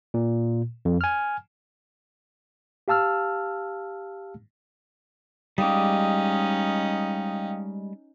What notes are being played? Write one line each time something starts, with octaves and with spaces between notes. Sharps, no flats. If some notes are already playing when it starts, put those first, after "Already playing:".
A#2
F2
G#5 F6
G4 F5 A5 E6 F6
G3 G#3 C#4 D#4 F5 G5 D6 D#6